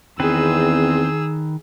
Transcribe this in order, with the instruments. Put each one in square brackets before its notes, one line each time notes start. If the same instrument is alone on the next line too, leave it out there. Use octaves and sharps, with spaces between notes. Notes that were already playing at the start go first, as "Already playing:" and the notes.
[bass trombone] E2 [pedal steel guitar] D#3 B4 [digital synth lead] C4 [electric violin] G#4 E6